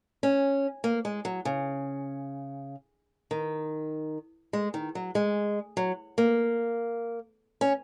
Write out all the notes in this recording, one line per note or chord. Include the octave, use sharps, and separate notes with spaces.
C#4
A#3
G#3
F#3
C#3
D#3
G#3
D#3
F#3
G#3
F#3
A#3
C#4